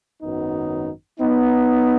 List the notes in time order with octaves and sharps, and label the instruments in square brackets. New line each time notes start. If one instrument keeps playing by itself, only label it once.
[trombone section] G#1 F#2 D#3 F#3 B3 D#4
B3 D#4